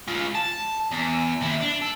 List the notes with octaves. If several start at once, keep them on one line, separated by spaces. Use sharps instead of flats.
G#3 F4
A5
E2
D#2 E4
D4
A4